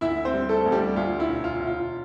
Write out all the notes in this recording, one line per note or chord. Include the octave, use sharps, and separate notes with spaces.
D2 E4 E5
C4 C5
G3
A3 A4
D2
G3 G4
D2 F4
E4
E1
F4
E1
F4